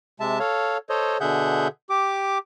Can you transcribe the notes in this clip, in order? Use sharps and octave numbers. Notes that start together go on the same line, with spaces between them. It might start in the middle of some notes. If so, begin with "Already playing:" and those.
C3 G#3 E5 A5
A4 C#5 F5
A4 C5 C#5 D#5
B2 D3 G#4 E5 F#5 G6
G4 D6